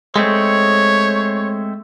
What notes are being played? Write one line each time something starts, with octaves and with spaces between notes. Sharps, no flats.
G#3 A3 C4 C#5